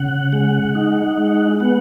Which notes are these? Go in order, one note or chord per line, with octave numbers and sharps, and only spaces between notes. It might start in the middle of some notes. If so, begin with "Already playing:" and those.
Already playing: C#3 F#5
G#3 F#5
D#4
G#3
B3 F#5